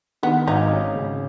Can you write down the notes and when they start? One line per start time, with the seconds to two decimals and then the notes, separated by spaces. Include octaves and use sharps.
0.23 D#3 B3
0.47 G#1 D#4
0.72 C#4
0.95 C#3